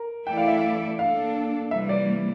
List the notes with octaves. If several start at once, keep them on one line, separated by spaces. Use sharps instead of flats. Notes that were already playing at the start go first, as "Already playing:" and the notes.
Already playing: A#4
E3 A3 E4 A4 D5 G5
F5
E5
F5
A#3 D4 A4 F5
C3 E3 G3 A#3 E5
D5